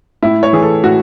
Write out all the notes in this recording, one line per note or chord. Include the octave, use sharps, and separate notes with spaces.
A2 E4
C#5
E3 G#4
A4
A2 F#4